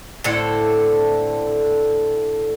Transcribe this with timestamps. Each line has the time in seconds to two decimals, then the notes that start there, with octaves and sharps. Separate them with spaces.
0.24 A2 D3 C4 A4